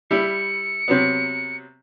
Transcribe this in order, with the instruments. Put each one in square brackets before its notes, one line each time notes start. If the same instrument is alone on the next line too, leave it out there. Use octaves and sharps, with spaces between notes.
[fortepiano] G3 E4 [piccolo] C#7
[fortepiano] C3 F#3 B3